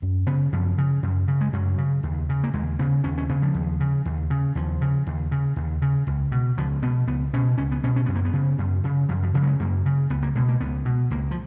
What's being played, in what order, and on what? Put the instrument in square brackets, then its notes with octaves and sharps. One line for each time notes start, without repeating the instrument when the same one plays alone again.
[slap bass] F#2
C#3 B3
F#2 F3
C#3
F#2
C#3
G#3
F#2 F#3
C#3
D#2
C#3
A#3
D#2 G#3
C#3 B3
D#2 C#4
C#4
C#3 B3
F3
D#2
C#3
D#2
C#3
D#2 F3
C#3
D#2
C#3
D#2
C#3
C#2
B2
C#2 F3
B2 B3
C#2 B3
B2 C#4
C#2 C#4
B3
B2 C#4
C#4
F#2 B3
A#3
B3
C#3
F#2
C#3
F#2 F3
F3
C#3 F3
F#3
G#3
F#2 A#3
C#3
C#2 B3
A#3
B2 G#3
A#3
C#2 B3
B2
C#2 A#3
F3